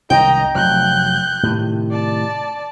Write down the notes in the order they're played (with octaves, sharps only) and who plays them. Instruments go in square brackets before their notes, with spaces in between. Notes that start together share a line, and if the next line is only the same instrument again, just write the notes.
[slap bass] C2 F#2 D#3 [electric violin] D#5 A#5 [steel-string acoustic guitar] G5
[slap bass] F1 F#3 [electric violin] F#6 G6
[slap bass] A2 C3 D#3
[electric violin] D5 A5